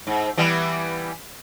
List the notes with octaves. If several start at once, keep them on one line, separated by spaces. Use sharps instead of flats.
G#2
E3 G3 B3